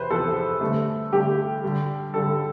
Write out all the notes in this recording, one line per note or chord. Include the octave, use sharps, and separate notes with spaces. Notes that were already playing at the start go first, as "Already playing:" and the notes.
Already playing: E2 C3 B4 C5
E2 C3 F3 B3 A4
G2 D3 A3
G2 D3 A3 G4
G2 D3 G3
G2 D3 G3 A4